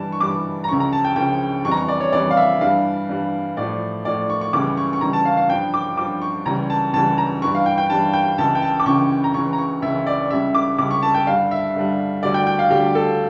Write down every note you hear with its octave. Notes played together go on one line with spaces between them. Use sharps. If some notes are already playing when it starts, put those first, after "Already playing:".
Already playing: G2 E3 G3 A5
C#6
G2 E3 G3 D6
A#5
C#2 C#3 F3 C#6
A#5
A5
G5
C#2 C#3 F3 G5
F2 E3 G3 C#6
A#5
C#6
D5
C#5
F2 E3 G3 D5
F5
E5
G2 E3 G3 F5
G2 E3 G3
A2 F3 D5
A2 F3 D5
C#6
C#6
C#2 C#3 E3 G3 D6
C#6
C#6
C#2 C#3 E3 G3 A#5
A5
F5
F5
G2 F3 G5
D6
G2 F3 D6
C#6
C#2 C#3 E3 G3 A#5
A5
C#2 C#3 E3 G3 A5
A#5
G2 E3 G3 C#6
F5
G5
G5
G2 E3 G3 A5
G5
C#2 C#3 E3 A5
G5
A5
D6
C#2 C#3 E3 C#6
A#5
C#2 C#3 E3 C#6
A#5
C#6
C#2 C#3 E3 E5
D5
C#2 C#3 G3 E5
D6
C#2 C#3 G3 D6
C#6
A5
G5
G2 D3 G3 F5
E5
G2 D3 G3
D2 D3 G3 D5
G5
G5
F5
D2 D3 G3 G4
A4